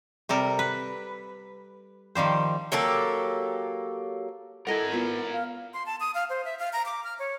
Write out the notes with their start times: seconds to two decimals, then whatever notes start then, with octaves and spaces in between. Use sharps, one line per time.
0.29 C3 G3 A4 A#4
0.59 B4
2.15 D#3 F3 G3 C5
2.72 F#3 A#3 G4 A4
4.67 E4 A4 A#4 D#5 F#5 G#5
4.92 B3 E4 F4
5.33 F5
5.74 C6
5.86 A5
6.00 D#6
6.15 F5
6.30 C5
6.45 E5
6.59 F5
6.73 A#5
6.86 D6
7.04 F6
7.19 C#5